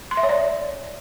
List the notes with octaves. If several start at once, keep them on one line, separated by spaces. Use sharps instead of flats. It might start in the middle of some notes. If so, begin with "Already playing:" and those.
C6
E5
C#5
D5